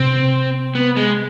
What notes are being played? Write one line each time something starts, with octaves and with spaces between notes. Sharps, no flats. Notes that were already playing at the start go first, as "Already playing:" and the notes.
Already playing: C3 C4
B3
G#3